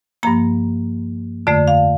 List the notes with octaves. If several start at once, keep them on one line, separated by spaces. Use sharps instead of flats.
G2 F3 A#3 A#5
F2 D3 A3 D5
F5